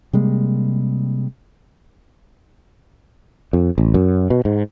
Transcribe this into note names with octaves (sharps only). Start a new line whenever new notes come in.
C3 G3 G#3 A#3
F2
A1
F#2
B2
G#2